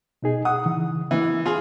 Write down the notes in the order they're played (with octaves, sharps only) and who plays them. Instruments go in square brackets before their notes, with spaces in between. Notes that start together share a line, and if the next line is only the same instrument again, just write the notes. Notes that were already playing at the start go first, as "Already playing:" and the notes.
[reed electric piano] B2 D#4 G#4
[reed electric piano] F#5 [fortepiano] D#6
[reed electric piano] C#3 E3
[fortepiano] E3 [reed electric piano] A#3
[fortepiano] F4 G#4